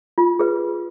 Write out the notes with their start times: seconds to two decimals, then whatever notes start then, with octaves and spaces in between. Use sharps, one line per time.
0.18 F4
0.39 G#4 B4